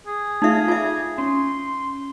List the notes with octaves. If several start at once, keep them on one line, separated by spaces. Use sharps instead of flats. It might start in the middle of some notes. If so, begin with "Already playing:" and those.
G#4
A3 D#4 F4 G#4 E5 F5
F4 E5 D6 G#6
C#4 C6